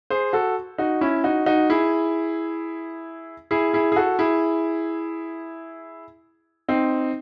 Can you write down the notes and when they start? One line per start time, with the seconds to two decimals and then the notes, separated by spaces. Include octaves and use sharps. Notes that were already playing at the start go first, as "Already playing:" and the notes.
0.10 G#4 C5
0.33 F#4 A4
0.78 D#4 F#4
1.01 C#4 E4
1.24 D#4 F#4
1.46 D#4 F#4
1.70 E4 G#4
3.51 E4 G#4
3.73 E4 G#4
3.92 G#4
3.96 F#4 A4
4.19 E4 G#4
6.68 C4 D#4